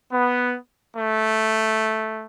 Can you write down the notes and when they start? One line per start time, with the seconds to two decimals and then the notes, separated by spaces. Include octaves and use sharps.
0.11 B3
0.95 A3